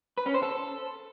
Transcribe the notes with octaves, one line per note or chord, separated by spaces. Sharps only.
B4
C#4
C5
A4